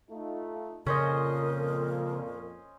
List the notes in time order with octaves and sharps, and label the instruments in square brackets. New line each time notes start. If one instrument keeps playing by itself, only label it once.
[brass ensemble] A3 D#4 F4
[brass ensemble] F2 A#2 [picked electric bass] C#3 [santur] C#4 C5 D#5 [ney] A#4